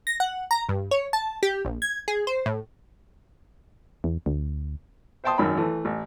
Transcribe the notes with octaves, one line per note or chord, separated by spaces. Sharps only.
A#6
F#5
A#5
G2
C#5
A5
G4
A#1
G#6
G#4
C5
A2
E2
D2
C5 E5 G5 A5 C6 D#6
G#1 F#2 D#3 B5
E3 A3
A1